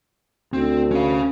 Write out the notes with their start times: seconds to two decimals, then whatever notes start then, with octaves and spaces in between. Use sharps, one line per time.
0.53 D2 C4
0.92 C#4 F5